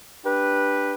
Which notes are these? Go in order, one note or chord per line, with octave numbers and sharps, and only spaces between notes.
D4 G4 B4